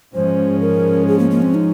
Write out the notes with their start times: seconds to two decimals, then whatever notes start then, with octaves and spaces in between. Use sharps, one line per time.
0.14 G#2 F3 G#3 C#4 C5
0.61 A#4
1.08 G#4
1.19 A#3
1.31 A#3
1.42 C4
1.54 D#4